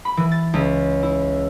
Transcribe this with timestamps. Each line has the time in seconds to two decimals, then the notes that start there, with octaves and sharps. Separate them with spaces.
0.05 B5
0.17 E3
0.32 A6
0.54 C#2
1.03 E4